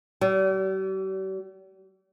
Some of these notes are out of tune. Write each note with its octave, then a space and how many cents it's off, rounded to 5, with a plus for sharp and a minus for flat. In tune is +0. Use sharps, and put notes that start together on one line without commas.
G3 -45